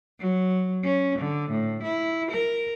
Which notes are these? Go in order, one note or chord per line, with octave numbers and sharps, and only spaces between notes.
F#3
C#4
D3
A2
E4
A#4